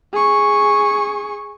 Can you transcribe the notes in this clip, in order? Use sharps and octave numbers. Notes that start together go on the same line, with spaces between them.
G#4 C#6